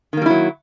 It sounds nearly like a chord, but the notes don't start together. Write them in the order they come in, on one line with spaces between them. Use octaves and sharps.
D#3 A#3 G3 E4 F#3